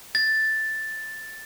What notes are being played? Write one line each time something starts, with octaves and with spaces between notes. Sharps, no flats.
A6